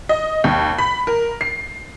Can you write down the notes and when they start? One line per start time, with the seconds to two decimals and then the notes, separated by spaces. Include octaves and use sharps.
0.09 D#5
0.44 D#2
0.78 B5
1.07 A#4
1.41 C7